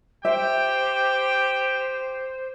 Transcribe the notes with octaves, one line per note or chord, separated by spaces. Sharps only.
G4 C5 E5 G5